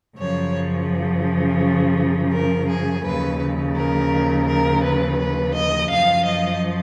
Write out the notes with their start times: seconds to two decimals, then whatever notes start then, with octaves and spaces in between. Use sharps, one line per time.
0.17 F#2 C#3 F3 C#5
2.32 A#4
2.68 G#4
3.04 D#2 C#3 F3 B4
3.76 A#4
4.47 A#4
4.83 B4
5.19 B4
5.54 D#5
5.90 F#2 F3 F5
6.26 D#5